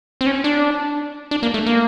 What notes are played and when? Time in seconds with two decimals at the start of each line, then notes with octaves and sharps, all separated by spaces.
0.21 C4
0.26 C#4
0.44 D4
1.31 D4
1.43 A#3
1.54 A3
1.66 A#3